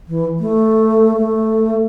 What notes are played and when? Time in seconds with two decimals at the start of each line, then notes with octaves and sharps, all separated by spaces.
0.08 E3
0.40 A3
1.17 A3